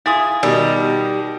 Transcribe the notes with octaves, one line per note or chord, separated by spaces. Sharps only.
E4 F4 G#4 D#6 A6
B2 D#3 G3 D#4 E6